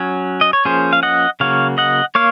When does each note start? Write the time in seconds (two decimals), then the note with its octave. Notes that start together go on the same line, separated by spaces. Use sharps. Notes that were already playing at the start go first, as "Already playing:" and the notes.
Already playing: F#3 C#4
0.41 D#5
0.53 C#5
0.65 F3 A#3 C#4 G#4 C5
0.93 F5
1.03 D#5 F#5
1.40 C#3 F#3 A#3 C#5 F5
1.78 D#5 F#5
2.15 A#3 C#5 F5